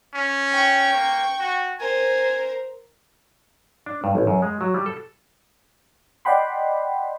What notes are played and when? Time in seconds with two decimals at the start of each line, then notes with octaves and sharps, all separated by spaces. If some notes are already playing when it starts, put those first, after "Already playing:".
0.14 C#4
0.52 G5 C#6
0.94 A#3
1.39 F#4
1.80 A#4 C5 G#5
3.86 D4
4.04 G2
4.15 A1
4.27 F#2
4.42 G#3
4.61 F#3
4.74 G3
4.86 A4
6.25 D5 D#5 F#5 G5 B5 C6